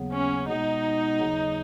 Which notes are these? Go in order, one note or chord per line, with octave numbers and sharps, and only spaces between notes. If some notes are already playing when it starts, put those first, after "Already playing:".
Already playing: D#2 C#3 F#3 B3
C#4
B2 G#3 B3 D#4
D#2 C#3 F#3